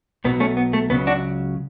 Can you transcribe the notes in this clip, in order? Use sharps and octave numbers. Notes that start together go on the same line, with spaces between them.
B1 B2 F#3 B3
A3 C#4
B3
A3
C#2 C#3 F#3 B3
D4 F#4